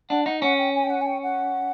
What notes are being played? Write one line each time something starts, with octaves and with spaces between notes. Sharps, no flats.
D4 F#5
D#4 F#5
C#4 F#5
G5
G#5
G5
F#5
G#5
G5
F#5